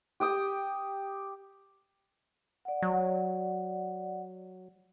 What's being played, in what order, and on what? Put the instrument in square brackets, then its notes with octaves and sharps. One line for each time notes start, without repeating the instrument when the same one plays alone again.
[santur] G4 G5 D#6
[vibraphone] D5 F#5
[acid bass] F#3